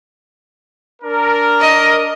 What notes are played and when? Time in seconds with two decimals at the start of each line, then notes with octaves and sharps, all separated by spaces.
1.03 D4 A#4
1.60 D#5